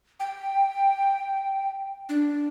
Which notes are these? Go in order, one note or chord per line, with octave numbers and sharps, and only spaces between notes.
G5
D4